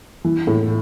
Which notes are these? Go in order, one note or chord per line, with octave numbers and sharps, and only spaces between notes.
E3
A2